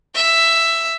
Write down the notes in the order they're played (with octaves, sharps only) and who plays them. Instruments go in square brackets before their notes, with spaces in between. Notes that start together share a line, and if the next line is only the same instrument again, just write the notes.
[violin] E5